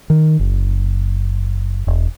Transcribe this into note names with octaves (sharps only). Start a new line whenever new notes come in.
D#3
F#1
E1